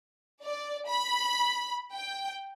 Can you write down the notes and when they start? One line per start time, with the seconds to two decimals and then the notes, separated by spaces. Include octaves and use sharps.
0.43 D5
0.88 B5
1.93 G5